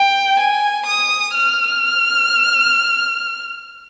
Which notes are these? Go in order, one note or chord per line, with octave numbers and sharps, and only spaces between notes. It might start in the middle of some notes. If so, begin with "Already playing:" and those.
Already playing: G5
G#5
D#6
F6